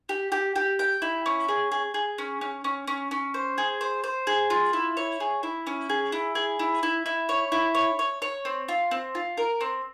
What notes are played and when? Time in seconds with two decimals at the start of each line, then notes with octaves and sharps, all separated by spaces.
0.09 G4
0.32 G4
0.56 G4
0.79 G5
1.02 E4
1.26 C#4
1.48 G#4
1.72 G#4
1.94 G#4
2.18 C#4
2.41 C#4
2.64 C#4
2.87 C#4
3.11 C#4
3.34 C5
3.58 G#4
3.81 C5
4.04 C5
4.27 G#4
4.50 F4
4.73 E4
4.97 C#5
5.20 G#4
5.43 E4
5.67 C#4
5.90 G#4
6.12 E4
6.35 G#4
6.59 E4
6.83 E4
7.06 E4
7.29 C#5
7.52 E4
7.75 C#5
7.99 C#5
8.22 C#5
8.45 C4
8.68 F4
8.91 C4
9.15 F4
9.38 A#4
9.61 C4